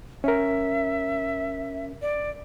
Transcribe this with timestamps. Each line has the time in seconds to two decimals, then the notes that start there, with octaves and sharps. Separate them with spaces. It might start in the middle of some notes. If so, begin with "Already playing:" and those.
0.24 C#4 A#4 E5
2.02 D5